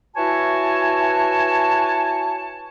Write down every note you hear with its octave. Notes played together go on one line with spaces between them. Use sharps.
E4 F#4 B4 C#5 G#5 A5